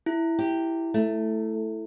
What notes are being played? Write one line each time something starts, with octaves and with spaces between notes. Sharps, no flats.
E4
G4
A3